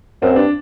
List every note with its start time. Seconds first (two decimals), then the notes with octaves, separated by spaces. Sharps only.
0.22 F#2 C4
0.34 G2 D4